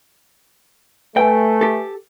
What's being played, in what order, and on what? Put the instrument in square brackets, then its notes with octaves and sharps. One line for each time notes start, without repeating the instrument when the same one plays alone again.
[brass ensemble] A3 [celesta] B4 G#5 [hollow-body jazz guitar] G5
[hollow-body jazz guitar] G4 A4